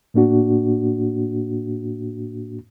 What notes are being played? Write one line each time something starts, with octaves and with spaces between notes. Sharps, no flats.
A2 A#3 D4 F#4